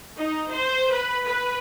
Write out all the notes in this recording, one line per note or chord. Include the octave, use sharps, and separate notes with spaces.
D#4
C5
B4
B4